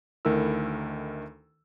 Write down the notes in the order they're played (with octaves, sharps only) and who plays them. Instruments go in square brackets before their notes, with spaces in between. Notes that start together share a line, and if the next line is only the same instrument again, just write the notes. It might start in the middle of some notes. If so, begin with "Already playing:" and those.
[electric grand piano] D2 D#3 A3 E4 A#4 E6